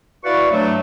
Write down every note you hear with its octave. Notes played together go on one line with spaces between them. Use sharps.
E4 F#4 B4 D5 F5 C#6
G2 F#3 A3